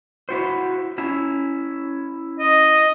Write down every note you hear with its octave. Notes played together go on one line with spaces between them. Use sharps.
E4 F#4 C5
C#4 E4
D#5